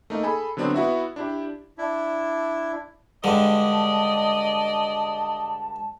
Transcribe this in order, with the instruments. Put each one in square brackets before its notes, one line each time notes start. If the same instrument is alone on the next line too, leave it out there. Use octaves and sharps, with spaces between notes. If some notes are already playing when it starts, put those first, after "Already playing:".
[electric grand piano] A3 A#3 D#4
G#4 A4 G#5 B5
D3 F#3 B3 C4 D4
B3 E4 F#4 E5
D4 E4 G4
[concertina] D4 E4
[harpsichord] G2 D3 G#3 [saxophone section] D5 D#5 [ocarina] A5